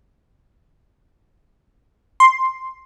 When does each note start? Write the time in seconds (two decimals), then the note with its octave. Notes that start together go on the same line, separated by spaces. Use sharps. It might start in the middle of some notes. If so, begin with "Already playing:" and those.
2.20 C6